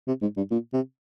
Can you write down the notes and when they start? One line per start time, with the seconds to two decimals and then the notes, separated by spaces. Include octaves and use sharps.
0.08 C3
0.22 G#2
0.37 G2
0.51 A#2
0.73 C3